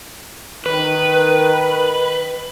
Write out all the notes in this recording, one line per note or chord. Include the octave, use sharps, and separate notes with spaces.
D#3 B4